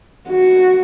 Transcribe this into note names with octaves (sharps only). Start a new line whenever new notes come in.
F#4